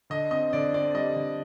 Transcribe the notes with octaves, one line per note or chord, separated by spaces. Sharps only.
D3 D#5
C4 D#5
D3 D5
C4 D5
G3 D#5
D3